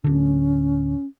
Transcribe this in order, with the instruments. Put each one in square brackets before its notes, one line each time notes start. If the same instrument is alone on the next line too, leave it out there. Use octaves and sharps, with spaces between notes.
[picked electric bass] D1 D3 [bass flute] C#4